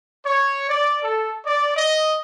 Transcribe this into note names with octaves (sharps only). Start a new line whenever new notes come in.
C#5
D5
A4
D5
D#5